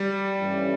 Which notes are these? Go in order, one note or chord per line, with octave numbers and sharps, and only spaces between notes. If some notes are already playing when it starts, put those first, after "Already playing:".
Already playing: G3
G2 E3 A3 C#4